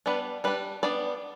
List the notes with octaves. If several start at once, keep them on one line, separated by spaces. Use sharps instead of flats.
G3 B3 D4 B4
G3 D4 B4
G3 B3 D4 D5